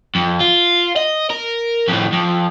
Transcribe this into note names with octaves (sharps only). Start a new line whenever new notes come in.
F2
F4
D#5
A#4
F2 A2
F2